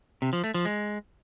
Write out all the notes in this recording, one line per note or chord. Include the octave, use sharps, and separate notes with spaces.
C3
F3
A3
F3
G#3